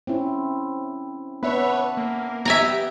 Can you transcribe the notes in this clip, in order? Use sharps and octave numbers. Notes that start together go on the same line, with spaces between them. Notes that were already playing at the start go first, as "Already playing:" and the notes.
C4 C#4 E4
B3 D4 B4 C#5 E5
A#3
B3 G4 E5 G#5 A#5